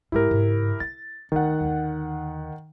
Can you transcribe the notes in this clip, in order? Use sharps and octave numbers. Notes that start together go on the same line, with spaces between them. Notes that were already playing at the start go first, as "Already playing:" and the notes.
G#2 G#3 E4 G4 A#4
G#2 C#3
E4 A6
D2 D#3 F#5
D#2 D3